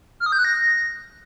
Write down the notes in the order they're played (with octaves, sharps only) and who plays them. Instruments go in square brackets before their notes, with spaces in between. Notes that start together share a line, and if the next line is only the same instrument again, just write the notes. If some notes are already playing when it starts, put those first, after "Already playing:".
[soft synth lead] F6
D#6
G6
F#6
A#6